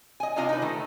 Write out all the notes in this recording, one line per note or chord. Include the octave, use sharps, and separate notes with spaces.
D#5 G#5
C3 D4 F4 D#5
D#4 B4
D#3 A3